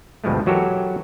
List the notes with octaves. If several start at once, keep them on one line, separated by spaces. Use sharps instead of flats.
D2 G2 B2 F3 G#3 A3
E3 F#3 F#4 G4 A4 A#4